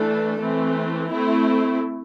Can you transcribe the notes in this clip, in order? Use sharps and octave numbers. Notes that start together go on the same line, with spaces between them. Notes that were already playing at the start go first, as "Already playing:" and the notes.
Already playing: E3 A3 D4 A4
E3 A3 C4
A3 C4 E4